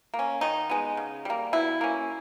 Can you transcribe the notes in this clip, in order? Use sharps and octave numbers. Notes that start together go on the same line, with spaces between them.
A#3
C#4
D#3 D#4
G#3 B3
C#3
G3 A#3
B2 E4
A#3 C#4